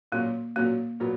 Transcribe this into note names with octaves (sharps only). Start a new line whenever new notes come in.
A#2 F#3 A#3 C#4 F#4
A#2 F#3 A#3 C#4 F#4
A#2 F#3 B3